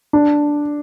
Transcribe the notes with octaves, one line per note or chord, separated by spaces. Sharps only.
D4